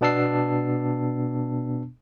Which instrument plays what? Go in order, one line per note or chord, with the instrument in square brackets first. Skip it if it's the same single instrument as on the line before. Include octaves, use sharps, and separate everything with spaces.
[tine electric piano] B2 B3 D4 A5 E6 C7